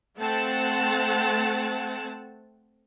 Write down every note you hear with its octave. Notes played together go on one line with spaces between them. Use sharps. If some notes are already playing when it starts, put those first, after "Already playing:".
A3 C4 F#5 A5